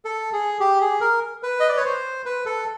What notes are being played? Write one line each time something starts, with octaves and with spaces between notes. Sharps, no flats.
A4
G#4
G4
G#4
A#4
B4
D#5
D5
C#5
C5
B4
A4